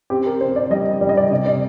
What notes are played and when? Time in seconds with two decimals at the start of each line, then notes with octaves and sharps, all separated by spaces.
0.10 C4 G4
0.26 A#4
0.41 C4 C5
0.56 D5
0.71 G3 D#5
1.01 G3 D5
1.09 D#5
1.17 D5
1.31 C3 D#5
1.46 D5